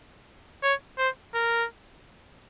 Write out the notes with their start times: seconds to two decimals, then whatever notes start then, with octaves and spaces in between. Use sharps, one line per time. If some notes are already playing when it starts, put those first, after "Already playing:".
0.63 C#5
0.98 C5
1.34 A#4